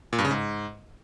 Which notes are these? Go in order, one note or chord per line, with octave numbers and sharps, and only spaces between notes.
A#2
G2
C#3
G#2